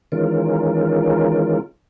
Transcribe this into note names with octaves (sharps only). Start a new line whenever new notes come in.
D#3 E3 G#3 C#4 F4 A#4